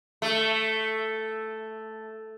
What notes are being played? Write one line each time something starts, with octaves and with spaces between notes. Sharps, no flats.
A3